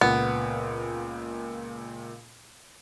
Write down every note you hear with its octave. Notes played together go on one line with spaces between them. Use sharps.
C#2 A#2 B3